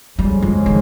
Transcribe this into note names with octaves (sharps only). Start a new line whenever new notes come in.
F2 C#3 G3 G#3
F3
D#3